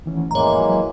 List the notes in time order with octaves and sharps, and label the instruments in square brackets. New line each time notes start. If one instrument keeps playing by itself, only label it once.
[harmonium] D2 [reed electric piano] D#3 E3 C#4
[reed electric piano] F2 A2 [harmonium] E3 G#3 A#3 [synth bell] C#5 A#5
[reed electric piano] F#3 E4 F#4